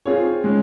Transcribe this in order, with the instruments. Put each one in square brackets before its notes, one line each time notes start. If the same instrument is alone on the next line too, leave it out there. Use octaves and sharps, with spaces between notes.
[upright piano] C4 F4 G#4 C#5
G#3 C#4